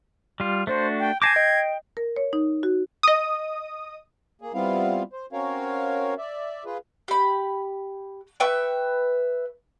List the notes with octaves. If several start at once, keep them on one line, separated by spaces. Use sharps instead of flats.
G3 F4
A3 D4 F#4 C5
G5
G#5 A5 D6 G6 G#6 A#6 C7
D#5 G5
A#4
C#5
D#4
F#4
D#5 D#6
A#3 G#4
G3 B3 C4 E4 F4 F5
C5
C4 C#4 F#4 A#4 C#5 F5
D5 E5
F4 G#4 B4
G4 B5
B4 E5 G5 C#6